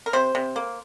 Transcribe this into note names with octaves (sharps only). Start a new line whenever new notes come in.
A#4
C3 C5
C3
A#3